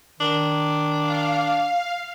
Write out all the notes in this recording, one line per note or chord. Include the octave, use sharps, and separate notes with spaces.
D#3 D4
F5